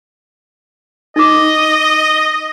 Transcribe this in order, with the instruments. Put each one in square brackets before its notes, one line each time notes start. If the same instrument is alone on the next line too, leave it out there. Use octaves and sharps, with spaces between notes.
[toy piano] D#4 D6 [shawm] D#5